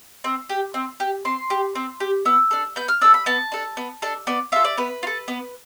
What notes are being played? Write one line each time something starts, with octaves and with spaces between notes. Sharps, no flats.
C4
G4
C4
G4
C4 C6
G4
C4
G4
B3 E6
D4 A4
B3 G6
F6
D4 A4 E6
B5
B3 A5
D4 A4
B3
D4 A4
B3 D5
F4 A4 E5
D5
B3 B4
F4
A4
B3